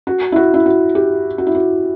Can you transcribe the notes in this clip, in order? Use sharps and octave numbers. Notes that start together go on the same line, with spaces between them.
F#4
E4
F#4
E4
F#4
G4
F#4
E4
F#4